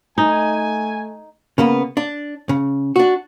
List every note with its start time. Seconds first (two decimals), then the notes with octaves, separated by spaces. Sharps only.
0.18 A3 D#4 G#5
1.58 C#3 A#3 B3
1.97 D4
2.49 C#3
2.96 D4 F#4